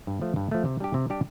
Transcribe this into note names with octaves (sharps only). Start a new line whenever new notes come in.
G2
F3 A3
G2
F3 A3
C3
G3 D4 G4
C3
G3 D4 G4